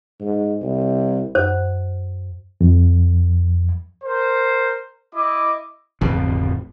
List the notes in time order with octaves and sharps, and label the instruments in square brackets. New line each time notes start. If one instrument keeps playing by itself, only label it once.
[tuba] G#2
C2
[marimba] F#2 F#5 [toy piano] C5
[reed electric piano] F2
[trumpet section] A#4 C5
E4 D#5 D6
[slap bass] D1 G#1 F2 B2